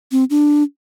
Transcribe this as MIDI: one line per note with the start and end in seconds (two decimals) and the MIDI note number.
0.12 0.24 60
0.30 0.63 62